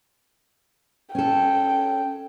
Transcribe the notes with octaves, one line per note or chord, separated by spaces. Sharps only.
C#4 A4 G5